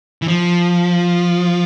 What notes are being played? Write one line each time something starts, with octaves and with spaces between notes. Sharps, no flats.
E3
F3